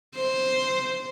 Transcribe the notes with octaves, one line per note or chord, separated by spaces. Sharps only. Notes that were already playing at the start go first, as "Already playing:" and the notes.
C5